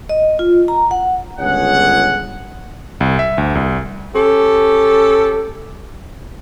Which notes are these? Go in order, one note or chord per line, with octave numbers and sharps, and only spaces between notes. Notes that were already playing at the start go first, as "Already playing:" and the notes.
D#5
F4
A#5
F#5
G1 C#2 G#4 C#5 F#5
C2
E5
D2
C2
C#4 G4 A4